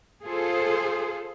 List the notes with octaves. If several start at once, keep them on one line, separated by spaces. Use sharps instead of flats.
F4 G#4 A4 C5